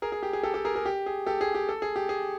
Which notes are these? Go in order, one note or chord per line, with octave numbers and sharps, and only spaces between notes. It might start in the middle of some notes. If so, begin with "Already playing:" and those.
G#4 A#4
G#4
G4
G#4
G4 A4
G4 A4
G#4 A#4
G#4 A#4
G4
G#4
G4 A4
G#4
G4
A4
G#4
G4
G#4